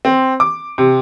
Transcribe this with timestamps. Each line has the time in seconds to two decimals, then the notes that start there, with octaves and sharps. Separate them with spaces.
0.05 C4
0.40 D6
0.78 C3